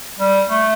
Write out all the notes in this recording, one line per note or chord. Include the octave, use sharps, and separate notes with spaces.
G3
A3